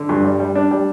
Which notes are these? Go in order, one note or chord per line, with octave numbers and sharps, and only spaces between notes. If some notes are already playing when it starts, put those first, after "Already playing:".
Already playing: D3
G2
G3
G3
D4
G3